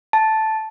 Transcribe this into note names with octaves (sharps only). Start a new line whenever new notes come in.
A5